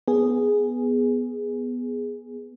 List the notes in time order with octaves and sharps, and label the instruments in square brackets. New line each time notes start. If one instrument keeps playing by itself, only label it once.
[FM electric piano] B3 G#4